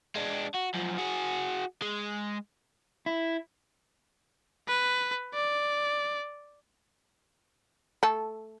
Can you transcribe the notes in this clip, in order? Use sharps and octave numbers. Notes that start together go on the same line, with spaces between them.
G#3 D4
F#4
F#2 F3
F#4 G#4
G#3
E4
B4
D5
A3 A4